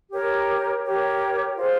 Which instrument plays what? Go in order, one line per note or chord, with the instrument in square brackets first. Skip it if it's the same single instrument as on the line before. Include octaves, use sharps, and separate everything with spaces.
[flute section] G4 A#4 C#5
G4 A#4 C#5
F4 G#4 C5